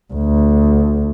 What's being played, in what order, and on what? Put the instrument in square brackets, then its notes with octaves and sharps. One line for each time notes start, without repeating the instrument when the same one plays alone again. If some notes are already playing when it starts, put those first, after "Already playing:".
[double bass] D2